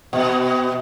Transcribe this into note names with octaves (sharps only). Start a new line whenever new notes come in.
B2